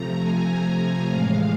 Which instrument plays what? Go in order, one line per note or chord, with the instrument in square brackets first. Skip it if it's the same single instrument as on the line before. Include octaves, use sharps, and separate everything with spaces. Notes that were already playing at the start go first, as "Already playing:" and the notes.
Already playing: [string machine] C3 F3 A3 A#5
G#5
A2 E3 G#3 F5